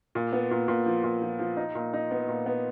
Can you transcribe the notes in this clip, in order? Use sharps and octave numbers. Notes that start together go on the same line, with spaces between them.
A#2
B3
A#2
A#2
F3
A#2
F3
F3
D#4
A#2
D#4
B3
A#2
B3